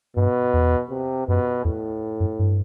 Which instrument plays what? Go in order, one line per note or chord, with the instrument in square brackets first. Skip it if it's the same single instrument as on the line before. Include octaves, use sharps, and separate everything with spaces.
[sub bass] G2 [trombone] B2
[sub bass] E2
[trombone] C3
[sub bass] F#2 [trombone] B2
[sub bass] E2 [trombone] A2
[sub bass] F#2
G2